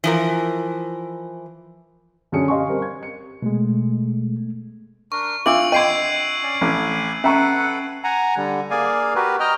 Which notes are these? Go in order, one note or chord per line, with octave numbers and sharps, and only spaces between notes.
E3 F3 A#4
F#2 D3 C#4 G#4 D#6 C#7
G4 D#5 F5 G#5 C6 C#6
G3 C4 A#4
G#6
C#7
B2 G#3 A3
D4 A#4 C#6
D4 F4 E5 F#5 D6 E6 D7 F#7
D#5 G5 C6 G#6 C7 D#7
C#4 D5
A1 G#5 D6
C#4 A4 B4 E5 F#5 A#5 C#6
F#5 G#5 A#5
D3 G3
A#3 G#4 D5 F5 G#5
F#4 G4 A#4 B4
D#5 G5 A#5 F6